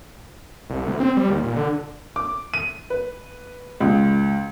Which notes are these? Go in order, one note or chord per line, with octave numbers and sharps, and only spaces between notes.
C2
D2
C4
G3
D#2
A#2
D3
D6
D#7
B4
C#2